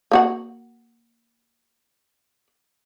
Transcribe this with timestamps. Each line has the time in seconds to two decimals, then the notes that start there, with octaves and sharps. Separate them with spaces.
0.11 A#3 F#4 F#5